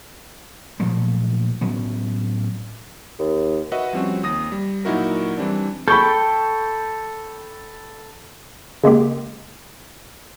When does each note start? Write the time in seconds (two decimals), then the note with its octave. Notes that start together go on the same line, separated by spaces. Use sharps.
0.80 A#2 F3 F#3 A3
1.61 A2 F#3 B3 C#4
3.19 D#2
3.72 F#4 B4 D#5 E5 F#5
3.93 F3 G3 C4 C#4 F#4
4.23 D#2 D#6 A#6
4.52 G3
4.85 A#2 F#3 D#4 E4 F#4 A#4
5.37 E3 G3 C4 D4
5.88 A4 G5 B5 C#6 G6
8.84 C#3 G#3 A#3 G4